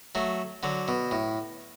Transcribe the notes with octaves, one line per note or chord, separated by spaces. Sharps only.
F#3 A3
D3 F#3
B2
A2